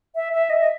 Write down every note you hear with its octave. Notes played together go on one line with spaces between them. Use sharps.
E5
E5
D#5
D#5